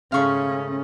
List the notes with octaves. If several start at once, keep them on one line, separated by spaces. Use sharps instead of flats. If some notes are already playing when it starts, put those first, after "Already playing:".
G#2 C#3 A3 C#4 F5 C#6